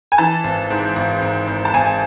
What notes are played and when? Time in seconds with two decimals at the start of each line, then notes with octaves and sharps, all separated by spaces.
0.12 G#5
0.18 E3 A5
0.44 G#1
0.70 G#2
0.96 G#1
1.22 G#1
1.47 G#1
1.65 A5
1.74 G#1 G#5